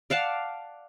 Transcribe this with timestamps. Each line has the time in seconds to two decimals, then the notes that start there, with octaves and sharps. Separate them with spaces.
0.10 D5 F5 F#5 A5